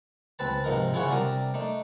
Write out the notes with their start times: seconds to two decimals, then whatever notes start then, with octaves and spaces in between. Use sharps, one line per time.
0.39 C#2 C4 B4 A5
0.64 G#2 C3 F3 D#4 A#4
0.92 C#3 E4 F4 G#4 C#5 F#5
1.08 C3 G3 D4 A#4 D#6
1.54 A3 D4 D#4